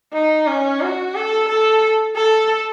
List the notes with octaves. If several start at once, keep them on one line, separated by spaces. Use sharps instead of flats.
D#4
C#4
F#4
A4
A4
A4